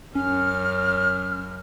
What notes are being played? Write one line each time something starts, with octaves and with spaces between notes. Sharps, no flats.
F#2 C#4 F6